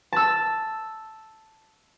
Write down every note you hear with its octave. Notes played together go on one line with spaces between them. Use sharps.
A5 E6